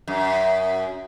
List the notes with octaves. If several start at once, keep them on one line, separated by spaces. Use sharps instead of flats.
F#2